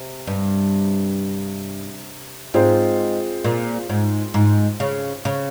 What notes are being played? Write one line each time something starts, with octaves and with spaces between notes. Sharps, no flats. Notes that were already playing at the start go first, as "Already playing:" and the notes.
Already playing: C3
G2
G#2 C4 F4 G#4 C5
A#2
G#2
G#2
C#3
C#3